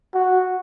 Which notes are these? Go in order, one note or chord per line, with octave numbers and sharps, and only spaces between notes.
F#4